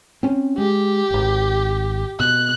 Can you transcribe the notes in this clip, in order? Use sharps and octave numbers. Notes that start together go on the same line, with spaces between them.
C4 C#4
G#3 G4
D1 G#1
B2 F#6